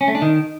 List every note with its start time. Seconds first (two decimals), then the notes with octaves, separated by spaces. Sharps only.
0.01 C#4
0.08 A3
0.15 D4
0.22 D#3